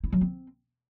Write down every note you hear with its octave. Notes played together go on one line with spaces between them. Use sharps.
E4
F#3
C4